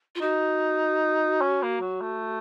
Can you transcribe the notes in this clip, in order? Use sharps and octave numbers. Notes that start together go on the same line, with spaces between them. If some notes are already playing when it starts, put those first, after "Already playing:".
F4
D#4 F#4
C#4
A#3
F#3
A3